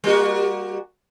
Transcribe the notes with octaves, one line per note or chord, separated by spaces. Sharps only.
G3 A#3 F#4